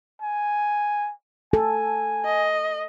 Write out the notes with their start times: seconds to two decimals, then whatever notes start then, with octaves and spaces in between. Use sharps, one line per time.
0.22 G#5
1.53 A4 G#5
2.25 D#5